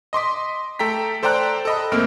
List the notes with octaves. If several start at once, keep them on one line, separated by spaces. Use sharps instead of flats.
D#5 C6 D6 B6
A3 A4 G5 A#5 B6
A4 C5 D5 G5 A#5 F#6
A4 D#5 B5
A#1 A3 A#3 C4 F6 D7